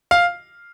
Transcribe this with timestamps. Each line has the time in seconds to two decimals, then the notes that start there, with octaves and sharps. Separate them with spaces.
0.11 F5